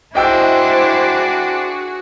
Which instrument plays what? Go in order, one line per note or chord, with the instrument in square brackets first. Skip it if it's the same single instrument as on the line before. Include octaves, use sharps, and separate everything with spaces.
[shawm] D4 [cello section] E4 C5 [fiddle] F#4 G#4 [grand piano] D#5 G5 E6